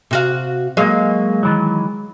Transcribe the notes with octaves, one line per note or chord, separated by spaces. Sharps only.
C3 F#4 F5
F#3 G#3 A#3 F5
D#3 E3 F#3